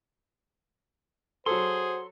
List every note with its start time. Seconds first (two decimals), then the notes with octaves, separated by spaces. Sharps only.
1.46 F#3 F#4 G#4 A4 C5 C6